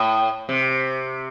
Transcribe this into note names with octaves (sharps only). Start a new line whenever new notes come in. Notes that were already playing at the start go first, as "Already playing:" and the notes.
Already playing: A2
C3